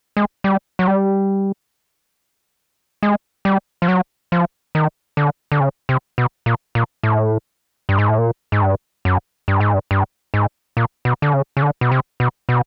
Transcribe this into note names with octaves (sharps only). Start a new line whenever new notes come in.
G#3
G3
F#3
G3
G#3
G3
F3
F#3
F3
D#3
D3
D3
C#3
C3
B2
A#2
A#2
A2
G2
G#2
A2
A#2
G#2
G2
F#2
G2
G#2
G2
G2
G#2
A#2
B2
D3
C#3
C#3
D3
B2
C3
B2
B2